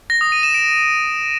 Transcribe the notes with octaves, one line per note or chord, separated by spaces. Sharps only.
A#6
D#6
D#7
E7
D7